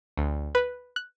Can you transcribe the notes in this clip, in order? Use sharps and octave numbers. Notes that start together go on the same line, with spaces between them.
D2
B4
F#6